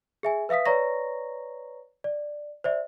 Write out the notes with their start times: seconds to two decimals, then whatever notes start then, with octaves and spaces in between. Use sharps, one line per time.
0.23 G#4 E5 G#5
0.49 B4 E5 F5 D#6 B6
0.65 B4 C#5 D5 A#5 C#6 A#6
2.04 D5
2.64 C5 D5 E5